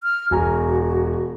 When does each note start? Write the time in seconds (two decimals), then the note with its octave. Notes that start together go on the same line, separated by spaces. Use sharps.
0.03 F6
0.31 E1 F#4 G#5 A#5